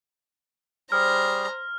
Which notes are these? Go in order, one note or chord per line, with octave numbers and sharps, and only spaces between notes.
G3 G#4 C5 A#5 F6